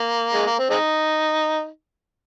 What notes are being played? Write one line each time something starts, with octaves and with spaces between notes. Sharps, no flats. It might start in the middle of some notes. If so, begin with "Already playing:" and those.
Already playing: A#3
G#3
A#3
C4
G#3 C4 D#4